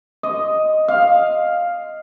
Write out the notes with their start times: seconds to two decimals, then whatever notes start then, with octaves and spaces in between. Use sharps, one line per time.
0.23 D#5
0.88 F5